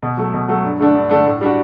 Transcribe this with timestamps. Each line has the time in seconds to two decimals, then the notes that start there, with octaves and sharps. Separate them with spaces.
0.02 B2
0.17 F#3 A3
0.34 B2
0.48 F#3 A3
0.64 G2
0.79 D3 A3 D4
0.95 G2
1.09 D3 A3 D4
1.25 A2
1.41 G3 D4 F#4